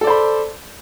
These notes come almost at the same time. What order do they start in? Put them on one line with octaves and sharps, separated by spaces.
A4 D5 C5 B5